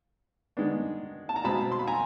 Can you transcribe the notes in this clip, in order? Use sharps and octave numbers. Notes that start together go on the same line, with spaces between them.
D#3 G#3 B3 D4
A5
A#5
B2 G#3 C4 A5 B5
C6
B5
G#5 A#5